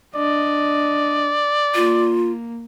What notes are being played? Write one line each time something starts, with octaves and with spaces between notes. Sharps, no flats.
D4 D5 D#5
A#3 F4